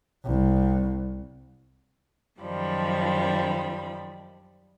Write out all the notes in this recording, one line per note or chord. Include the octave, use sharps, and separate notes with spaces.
C2
F#2 D#3 F3 G3 B5